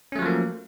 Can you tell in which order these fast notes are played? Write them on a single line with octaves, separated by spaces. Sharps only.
C#4 A3 F#3 F3 A#3